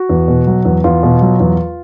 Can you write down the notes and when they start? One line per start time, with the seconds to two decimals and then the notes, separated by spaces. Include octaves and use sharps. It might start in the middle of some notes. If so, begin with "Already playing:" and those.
Already playing: F#4
0.10 E2
0.28 B2
0.47 F#3
0.65 E2
0.84 E2 F4
1.03 B2
1.21 F#3
1.40 E2